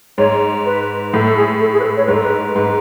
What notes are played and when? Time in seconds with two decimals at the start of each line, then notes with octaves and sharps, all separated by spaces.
0.18 G#2 C#5
0.65 B4
1.13 A2 A4
1.25 A4
1.36 G#4
1.61 A4
1.73 G#4
1.80 B4
1.84 A4
1.96 C#5
2.05 G#2 B4
2.14 A4
2.23 B4
2.55 G#2 B4